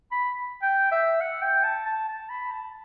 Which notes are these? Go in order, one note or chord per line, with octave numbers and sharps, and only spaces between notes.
B5
G5
E5
F#5
G5
A5
A5
A5
B5
A5